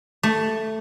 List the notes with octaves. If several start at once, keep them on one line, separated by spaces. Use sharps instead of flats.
A3